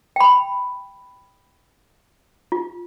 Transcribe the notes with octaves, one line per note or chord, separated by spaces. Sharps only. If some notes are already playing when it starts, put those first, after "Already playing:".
G5 B5
F4